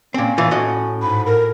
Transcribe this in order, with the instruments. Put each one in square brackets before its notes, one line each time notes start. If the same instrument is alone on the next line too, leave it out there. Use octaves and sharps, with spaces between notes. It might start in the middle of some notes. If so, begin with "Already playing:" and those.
[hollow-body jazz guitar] A#2 C4 [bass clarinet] C#4
[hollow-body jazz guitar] A2 E3 F4
A2 F#4 D#5
[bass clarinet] G#2 [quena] B5
[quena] A#4